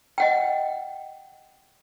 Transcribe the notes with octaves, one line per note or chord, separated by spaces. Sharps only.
D#5 F#5 G5